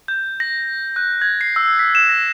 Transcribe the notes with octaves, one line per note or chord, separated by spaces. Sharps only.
G6
A#6
F#6
G#6
C7
E6
B6
E7
A#6